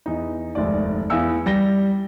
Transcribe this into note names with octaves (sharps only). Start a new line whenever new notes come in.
E2 D#4
F1 D#2 G#2 D5
E2 E4 F5 E6 C#7
G3 A#6 G7